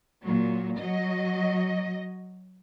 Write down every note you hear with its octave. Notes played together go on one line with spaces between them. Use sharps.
A#2 F#3
F#3 D#5